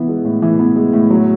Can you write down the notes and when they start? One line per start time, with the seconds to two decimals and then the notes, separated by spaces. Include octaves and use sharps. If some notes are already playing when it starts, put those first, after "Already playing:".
Already playing: E3 B3
0.08 G#3
0.24 A2
0.42 E3
0.59 B3
0.76 G#3
0.93 A2
1.10 F#3